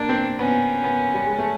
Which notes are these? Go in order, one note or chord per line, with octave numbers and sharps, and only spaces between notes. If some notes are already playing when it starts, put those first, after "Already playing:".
Already playing: A#3 D4
C4
B3 C#4
B3
G3
G#3
A3